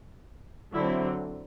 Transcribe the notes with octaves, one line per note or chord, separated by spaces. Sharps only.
D3 F#3 C4 E4